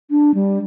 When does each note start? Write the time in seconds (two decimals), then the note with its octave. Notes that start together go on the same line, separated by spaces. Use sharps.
0.10 D4
0.34 G3